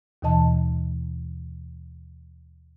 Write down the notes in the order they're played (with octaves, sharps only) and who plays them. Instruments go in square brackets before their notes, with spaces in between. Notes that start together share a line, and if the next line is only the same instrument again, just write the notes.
[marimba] D#2 B2 E3 D#5 A5